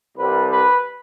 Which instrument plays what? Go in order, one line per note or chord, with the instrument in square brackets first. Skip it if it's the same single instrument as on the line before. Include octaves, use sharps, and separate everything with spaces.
[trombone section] C2 C3 G3 B4
B4